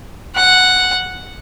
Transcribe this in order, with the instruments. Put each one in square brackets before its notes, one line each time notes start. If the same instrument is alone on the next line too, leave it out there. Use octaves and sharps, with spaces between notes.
[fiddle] F#5